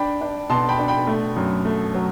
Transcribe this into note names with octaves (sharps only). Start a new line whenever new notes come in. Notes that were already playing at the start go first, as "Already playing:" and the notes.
Already playing: D4 G5 B5
D4
B2 A5 C6
G5 B5
D4
G5 B5
A3
F#2
A3
F#3